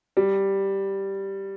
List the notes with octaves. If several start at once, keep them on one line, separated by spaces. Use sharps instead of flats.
G3